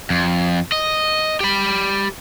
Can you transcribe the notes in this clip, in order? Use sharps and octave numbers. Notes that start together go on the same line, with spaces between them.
F2
D#5
G4 B5